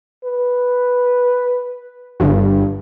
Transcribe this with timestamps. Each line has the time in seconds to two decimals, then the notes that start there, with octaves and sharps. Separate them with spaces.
0.24 B4
2.20 G1 G2